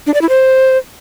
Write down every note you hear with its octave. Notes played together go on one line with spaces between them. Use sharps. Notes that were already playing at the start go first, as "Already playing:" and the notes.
D4
D5
E4
C5